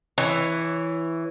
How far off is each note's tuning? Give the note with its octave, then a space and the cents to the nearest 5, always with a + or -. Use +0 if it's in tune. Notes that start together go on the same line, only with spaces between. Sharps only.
E3 +0 C#5 +10